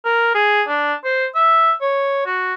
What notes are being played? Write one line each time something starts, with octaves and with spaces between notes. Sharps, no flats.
A#4
G#4
D4
C5
E5
C#5
F#4